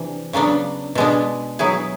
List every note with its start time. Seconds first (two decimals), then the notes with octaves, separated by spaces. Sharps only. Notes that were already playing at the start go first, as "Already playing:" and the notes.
Already playing: C3 E3 D4
0.33 C#3 F#3 B3 D4
0.95 B2 G#3 B3 D4
1.59 F#3 B3 E4 G#4